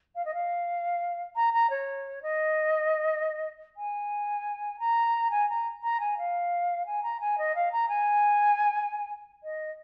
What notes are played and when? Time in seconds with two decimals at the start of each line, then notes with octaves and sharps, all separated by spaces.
0.15 F5
0.25 D#5
0.34 F5
1.35 A#5
1.53 A#5
1.69 C#5
2.22 D#5
3.76 G#5
4.79 A#5
5.30 G#5
5.49 A#5
5.82 A#5
6.00 G#5
6.17 F5
6.86 G#5
7.02 A#5
7.20 G#5
7.37 D#5
7.55 F5
7.71 A#5
7.88 G#5
9.43 D#5